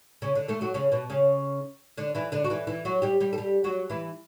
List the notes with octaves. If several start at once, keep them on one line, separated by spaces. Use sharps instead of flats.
C#3 C#4
D3 D4
A3 A4
F#3 F#4
C#3 C#4
B2 B3
C#3 C#4
D3 D4
E3 E4
D3 D4
F#4
E3 E4
E3 E4
F#3 F#4
G3 G4
G3 G4
A4
G3 G4
F#3 F#4
E3 E4